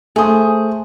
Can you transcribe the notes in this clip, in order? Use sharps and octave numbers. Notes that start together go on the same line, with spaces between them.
A3 G#4 C5 D#6